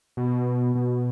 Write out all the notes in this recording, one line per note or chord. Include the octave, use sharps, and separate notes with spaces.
B2
B2